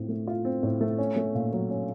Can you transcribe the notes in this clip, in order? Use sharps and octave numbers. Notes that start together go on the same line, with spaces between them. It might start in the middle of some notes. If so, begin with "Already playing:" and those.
Already playing: A2 C4 F4
A3
F4
C4
A2
A3
C#4
A3
A#2
F#3
C#4